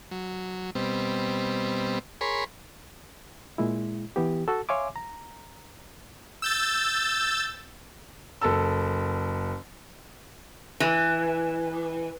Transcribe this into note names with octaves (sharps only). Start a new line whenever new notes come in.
F#3
B2 G3 C4
G#4 A#4 C#5 B5 C6
A#2 G#3 E4
E3 B3 G4
F#4 A4
C#5 E5 F5 G#5 C6 D6
A#5
E6 G6 A6
F#1 A4 A5 E6
E3